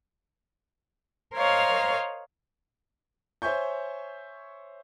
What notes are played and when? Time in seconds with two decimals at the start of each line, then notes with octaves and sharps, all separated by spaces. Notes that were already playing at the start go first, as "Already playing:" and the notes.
1.34 A#4 C5 C#5 D#5 F5
3.42 C5 C#5 E5 G#5 C#6 G6